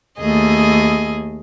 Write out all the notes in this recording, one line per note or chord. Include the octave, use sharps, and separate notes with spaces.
D#2 A3 G#4 D#5